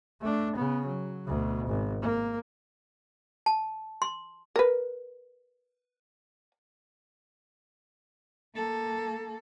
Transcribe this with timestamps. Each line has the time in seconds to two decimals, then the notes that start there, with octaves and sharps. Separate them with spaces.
0.21 A3 D4
0.56 C#3 B3
0.86 F#3
1.27 D2 B2
1.67 G#1
2.02 A#3
3.46 A5
4.02 C6
4.56 A#4 B4
8.55 A#3 A4